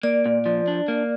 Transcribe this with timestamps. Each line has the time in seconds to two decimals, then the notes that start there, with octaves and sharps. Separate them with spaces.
0.03 A#3 D5
0.26 A#2
0.45 F3
0.68 D4
0.88 A#3